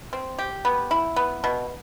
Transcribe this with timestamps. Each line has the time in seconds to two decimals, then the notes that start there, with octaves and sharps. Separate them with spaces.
0.13 C4
0.39 G4
0.65 B3
0.91 E4
1.16 B3
1.44 B2